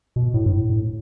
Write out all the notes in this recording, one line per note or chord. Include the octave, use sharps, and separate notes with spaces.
B2
A2
G2
A2
A2